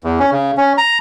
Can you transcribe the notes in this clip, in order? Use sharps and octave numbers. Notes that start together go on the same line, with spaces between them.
E2
C#4
C#3
C#4
A#5